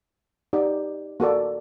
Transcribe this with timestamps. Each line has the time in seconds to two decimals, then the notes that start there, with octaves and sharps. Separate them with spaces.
0.53 D#4 G4 D5
1.20 A#3 F#4 A4 D5